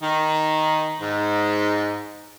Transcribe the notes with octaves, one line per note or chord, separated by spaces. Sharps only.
D#3
G#2